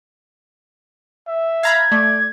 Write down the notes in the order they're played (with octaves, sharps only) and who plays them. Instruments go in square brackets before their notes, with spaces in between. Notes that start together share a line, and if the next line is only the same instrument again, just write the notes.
[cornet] E5
[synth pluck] F5 A#5 B5 [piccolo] G#6
[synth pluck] A3 [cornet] D5